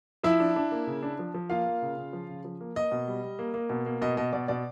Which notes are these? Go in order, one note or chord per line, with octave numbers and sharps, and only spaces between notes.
F3 E4 E5
D4
D4
A#3
C#3
D4
F3
F3
A#3 F4 F5
A#3
C#3
C#3
F3
C#3
F3
A#3
A#3 D#5
B2
G3
G3
A#3
A#3
B2
A#3
B2 D#5
B2 D#5
B2 D5
B2 D5